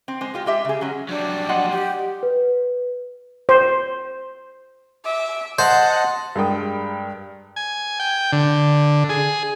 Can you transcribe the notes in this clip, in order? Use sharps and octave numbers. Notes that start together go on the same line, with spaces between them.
C4
G#3 C5
G#3 F4 G4
G#3 G4 E5
C#3 G#4
F#3 G#3 C#4
F#3 G3 D4
D#5 F#5 C6
G4
B4
C5
E5 D6
C5 D#5 F#5 A5
G2 G#3 A#4 G5 D#6
G#5
G5
D3
G#4